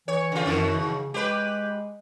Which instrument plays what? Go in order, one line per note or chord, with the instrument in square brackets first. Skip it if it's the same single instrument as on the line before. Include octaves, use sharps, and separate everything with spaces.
[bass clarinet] E3 [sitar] C#5
[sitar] C#3 F4
[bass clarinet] F#2 [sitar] B2 D#3
[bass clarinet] C#3
[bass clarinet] G#3 [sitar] G4 B4